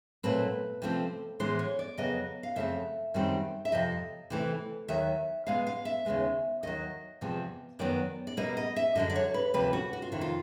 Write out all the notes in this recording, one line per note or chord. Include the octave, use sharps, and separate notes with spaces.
A#2 F#3 A3 C4 B4
C3 F3 A3 C4
A2 E3 G#3 B3 C5
C#5
D5
F2 C#3 F#3 B3 D#5
F5
F#2 C#3 F3 A3 C4 E5
F#2 D#3 G3 C4
E5
F2 C3 F3 D#5
C3 E3 A3
D#2 D#3 F#3 E5
B2 G#3 B3 F5
F5
E5
D#2 C#3 F3 G#3 B3
D#2 D#3 F#3 D#5
E2 C3 F3 G#3
F#2 D#3 F#3 B3 D5
D5
B2 G3 A#3 D#5
D#5
E5
F#2 D3 F#3 D#5
D5
C#5
B4
D2 C3 F3 A#3 B4
F#4
F#4
F4
F2 C3 D#3 E4
F4